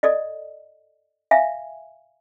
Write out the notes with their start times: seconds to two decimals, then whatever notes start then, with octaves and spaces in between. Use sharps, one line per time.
0.03 A4 D5 D#5
1.31 E5 F5 G#5